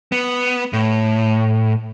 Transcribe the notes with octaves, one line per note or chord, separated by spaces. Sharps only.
B3
A2